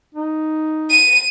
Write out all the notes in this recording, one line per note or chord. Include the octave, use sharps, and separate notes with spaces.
D#4
D#7